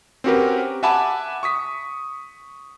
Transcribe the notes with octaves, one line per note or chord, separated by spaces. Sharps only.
C4 C#4 F#4 G4 A#4 B4
E5 F#5 G#5 A5 B5 D6
C#6 D#6 B6